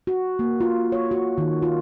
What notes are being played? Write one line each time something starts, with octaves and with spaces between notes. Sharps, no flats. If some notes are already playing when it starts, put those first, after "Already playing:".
F#4
A#3
F4
C#5
F#4
D#3
F4